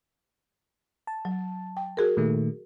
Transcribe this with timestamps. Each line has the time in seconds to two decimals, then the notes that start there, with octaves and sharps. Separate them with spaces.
1.07 A5
1.25 F#3
1.77 G5
1.97 F#4 G#4 A#4
2.17 A#2 D#3 A3